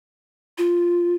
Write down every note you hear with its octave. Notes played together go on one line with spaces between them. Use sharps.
F4